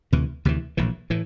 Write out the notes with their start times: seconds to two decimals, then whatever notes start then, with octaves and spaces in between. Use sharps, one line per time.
0.13 D2 C3 E3
0.45 D2 C3 E3
0.77 A#1 A2 E3
1.10 A2 E3